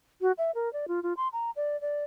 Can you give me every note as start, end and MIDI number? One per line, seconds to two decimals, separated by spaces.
0.21 0.32 66
0.38 0.51 76
0.55 0.71 70
0.73 0.85 74
0.88 1.02 65
1.03 1.13 65
1.17 1.28 84
1.33 1.51 82
1.56 1.79 74
1.81 2.04 74